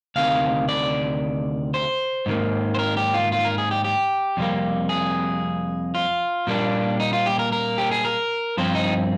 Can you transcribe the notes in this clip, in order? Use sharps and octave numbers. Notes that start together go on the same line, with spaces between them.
D2 C3 D#3 F5
D5
C5
G#2 D#3 A#3
C5
A#4
G4
F4
F4
A#4
G#4
G4
G4
F2 C3 G3 A#3
G#4
F4
A#2 G3 A#3 D4
D#4
F4
G4
A#4
A#4
G4
G#4
A#4
G2 F3 C4 C5
D#4